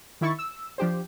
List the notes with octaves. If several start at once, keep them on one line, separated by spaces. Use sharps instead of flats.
D#3 E4 C#6 A6
E6
F3 D4 G4 C5